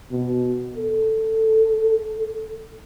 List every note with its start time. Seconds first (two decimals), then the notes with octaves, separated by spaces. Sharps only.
0.11 B2
0.76 A4